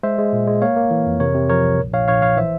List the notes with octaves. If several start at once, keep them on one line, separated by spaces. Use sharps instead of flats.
G#3 C5 E5
G#3
A#2
G#3
A#3 C#5 F5
A#3
E3
F2
C3 A#4 C#5
C3
F3 A#4 C#5
C2
A#1
A#1 C#5 F5
A#1 C#5 F5
A#1 C#5 F5
E3 C5 E5